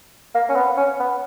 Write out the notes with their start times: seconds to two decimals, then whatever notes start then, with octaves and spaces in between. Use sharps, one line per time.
0.35 A#3
0.49 C#4
0.55 B3
0.77 C#4
1.00 B3